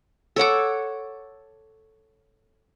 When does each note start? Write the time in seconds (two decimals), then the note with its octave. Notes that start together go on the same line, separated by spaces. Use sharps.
0.36 A4 C#5 F#5 D6